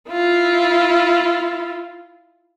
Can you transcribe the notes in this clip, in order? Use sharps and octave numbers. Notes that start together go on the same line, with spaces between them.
E4 F4